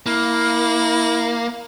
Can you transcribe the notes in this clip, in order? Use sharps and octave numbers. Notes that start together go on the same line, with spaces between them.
A#3 E4